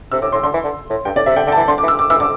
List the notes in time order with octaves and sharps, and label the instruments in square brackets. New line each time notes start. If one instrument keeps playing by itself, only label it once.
[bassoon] C3 [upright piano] E6
[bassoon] A2 [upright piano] D6
[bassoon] A2 [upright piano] C6
[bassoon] D3 [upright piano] C6
[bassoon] E3
D3
A2
[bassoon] G2 [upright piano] G5
[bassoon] A2 [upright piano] D5
[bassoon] C3 [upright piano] E5
[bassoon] D3 [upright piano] G5
[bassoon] D3 [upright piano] G5
[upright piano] A5
[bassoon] E3
[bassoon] D3 [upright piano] C6
[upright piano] D6
[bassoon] E3
[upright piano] E6
D6
[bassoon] E3 [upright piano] E6
[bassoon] D3 [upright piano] D6